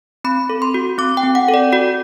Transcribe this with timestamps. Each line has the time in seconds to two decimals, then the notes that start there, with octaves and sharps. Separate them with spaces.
0.24 C4 B5
0.49 A4
0.62 C6
0.74 F#4
0.98 C4 D6
1.17 G5
1.23 C4
1.35 F#5
1.49 A4
1.54 D5
1.72 F#4 D5